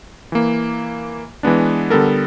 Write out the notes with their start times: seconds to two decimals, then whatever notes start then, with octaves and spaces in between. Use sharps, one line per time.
0.32 E3 A#3
1.43 E3 G#3 B3 D4
1.90 D3 G3 B3 A4 A#4